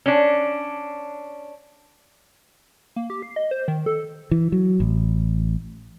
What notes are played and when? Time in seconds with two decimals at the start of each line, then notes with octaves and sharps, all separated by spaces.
0.06 C#4 D4
2.96 A#3
3.10 G4
3.22 C7
3.36 D#5
3.51 C5
3.68 D#3
3.86 A4
4.31 E3
4.52 F#3
4.80 A1